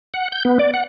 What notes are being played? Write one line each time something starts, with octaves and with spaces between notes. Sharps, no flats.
F#5
G6
B3
D5
F#5